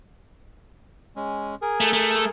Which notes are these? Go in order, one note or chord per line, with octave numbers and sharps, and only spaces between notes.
G#3 C#4
G#4 A#4 G#5
A3
A3